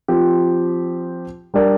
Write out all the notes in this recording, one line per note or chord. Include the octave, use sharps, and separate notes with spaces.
F3 C4 G4
G3 D4 G4 A#4 D5